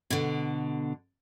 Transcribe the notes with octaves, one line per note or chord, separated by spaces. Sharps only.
B2 D3